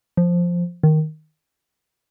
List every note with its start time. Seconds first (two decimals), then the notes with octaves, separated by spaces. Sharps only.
0.17 F3
0.83 D#3